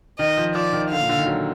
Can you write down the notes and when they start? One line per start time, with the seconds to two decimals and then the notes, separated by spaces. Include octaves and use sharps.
0.19 D#3 D#5
0.37 F3
0.55 F3 D5
0.73 D#3
0.91 D3 F5
1.00 A#2
1.09 D3
1.18 D#3
1.27 F#3